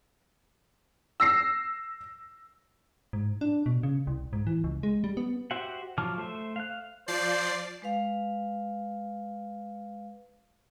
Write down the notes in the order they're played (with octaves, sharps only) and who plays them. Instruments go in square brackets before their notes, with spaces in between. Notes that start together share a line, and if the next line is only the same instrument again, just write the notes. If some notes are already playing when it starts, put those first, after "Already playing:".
[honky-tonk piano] E6 A#6 C7
[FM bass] G#2
D4
B2
C#3
C2
G#2
E3
C#2
G#3
G3
B3
[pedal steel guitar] F#4 G4 C5 E5 F#5
F3 F#3 A5 D6 F6
A3 C5 E5
F5 F#6
[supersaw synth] F3 D5 C7 [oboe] C5
[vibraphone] G#3 B4 F5